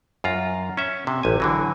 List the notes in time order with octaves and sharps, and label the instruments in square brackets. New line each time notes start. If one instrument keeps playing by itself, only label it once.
[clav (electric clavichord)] F#2 F4 A#5
C#4 E5
C3
A1 G#5
D3 E3 F#3